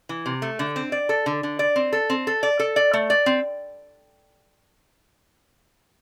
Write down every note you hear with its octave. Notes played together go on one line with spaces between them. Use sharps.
E3
C3
A3
D3
C4
D5
A4
D3
D3
D5
C4
A4
C4
A4
D5
A4
D5
A3
D5
C4